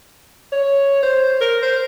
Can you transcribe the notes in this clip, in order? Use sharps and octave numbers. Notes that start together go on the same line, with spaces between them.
C#5
C5
A#4
C5